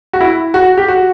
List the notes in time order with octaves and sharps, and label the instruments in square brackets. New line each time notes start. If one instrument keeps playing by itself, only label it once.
[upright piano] F#4
E4
F#4
G4
F#4